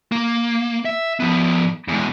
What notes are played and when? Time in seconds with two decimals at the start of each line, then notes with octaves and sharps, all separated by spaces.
0.12 A#3
0.85 E5
1.20 F3 B3
1.88 E2 G#3